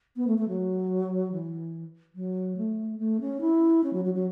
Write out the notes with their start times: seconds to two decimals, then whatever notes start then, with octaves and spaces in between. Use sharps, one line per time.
0.17 B3
0.27 A3
0.38 A3
0.48 F#3
1.32 E3
2.15 F#3
2.57 A3
2.99 A3
3.21 C#4
3.41 E4
3.84 C#4
3.93 F#3
4.05 F#3
4.15 F#3